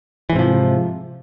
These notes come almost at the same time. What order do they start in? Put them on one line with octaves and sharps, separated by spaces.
E3 G#2 C3 F3